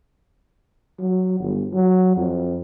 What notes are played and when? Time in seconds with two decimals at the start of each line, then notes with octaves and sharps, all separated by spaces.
0.99 F#3
1.40 G1
1.73 F#3
2.17 F2